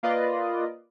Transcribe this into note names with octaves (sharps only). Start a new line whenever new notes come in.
A#3 F4 B4 D5 D#5